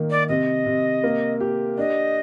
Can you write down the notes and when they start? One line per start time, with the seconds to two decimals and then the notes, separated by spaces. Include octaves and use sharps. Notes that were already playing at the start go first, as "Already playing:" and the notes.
Already playing: D#3 A#3
0.10 D5
0.29 C3 D#5
0.66 C3
1.04 A#3
1.40 G4
1.77 D4 D#5